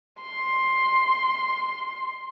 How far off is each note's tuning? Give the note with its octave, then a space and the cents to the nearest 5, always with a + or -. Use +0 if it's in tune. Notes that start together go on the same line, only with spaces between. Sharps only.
C6 +10